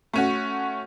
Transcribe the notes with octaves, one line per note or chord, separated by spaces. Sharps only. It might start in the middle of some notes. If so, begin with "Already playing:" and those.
A3 C#4 F#4